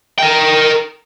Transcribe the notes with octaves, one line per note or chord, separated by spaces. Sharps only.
A#4 G5